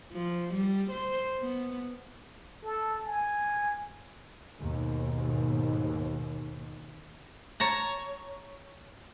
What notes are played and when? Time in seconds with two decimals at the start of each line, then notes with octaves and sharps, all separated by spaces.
0.12 F3
0.54 G3
0.91 C5
1.41 B3
2.64 A4
3.05 G#5
4.60 D#2 G#2 B2
7.60 C#5 A5 A#5